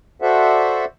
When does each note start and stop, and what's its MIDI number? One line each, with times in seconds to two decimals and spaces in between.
0.22 0.85 66
0.22 0.85 69
0.22 0.85 72
0.22 0.85 74
0.22 0.85 76
0.22 0.85 78